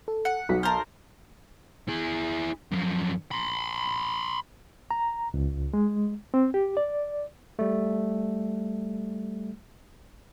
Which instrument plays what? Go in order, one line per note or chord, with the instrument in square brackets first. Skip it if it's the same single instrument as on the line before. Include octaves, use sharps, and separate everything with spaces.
[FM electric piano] A4
[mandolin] F#5
[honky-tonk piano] B1 [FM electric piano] B3 F#4 B6
[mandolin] A#4 C5 [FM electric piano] A5 A#5 F6
[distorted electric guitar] E4 G#4
F#2 F3
B5 C6
[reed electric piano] A#5
C#2
G#3
C4
G4
D5
[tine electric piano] G3 A3